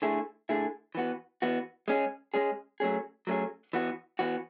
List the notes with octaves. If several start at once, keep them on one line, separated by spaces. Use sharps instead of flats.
D3 A3 E4 G#4
D3 A3 E4 G#4
E3 B3 F#4
E3 B3 F#4
G#3 C#4 G#4
G#3 C#4 G#4
F#3 A3 C#4 G#4
F#3 A3 C#4 G#4
E3 B3 F#4
E3 B3 F#4